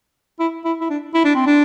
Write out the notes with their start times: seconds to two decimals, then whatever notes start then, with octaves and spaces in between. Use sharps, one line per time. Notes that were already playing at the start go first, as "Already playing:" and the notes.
0.40 E4
0.65 E4
0.81 E4
0.90 D4
1.14 E4
1.25 D4
1.35 C4
1.46 D4